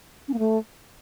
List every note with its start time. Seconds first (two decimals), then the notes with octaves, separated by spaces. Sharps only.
0.28 C#4
0.33 A#3
0.39 A3